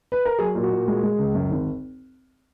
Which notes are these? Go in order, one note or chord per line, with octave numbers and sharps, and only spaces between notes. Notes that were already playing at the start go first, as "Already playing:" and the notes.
B4
A#4
F#3 G#4
A#2
F#4
A#2
G#3
G#3
C#2
F#2
G#1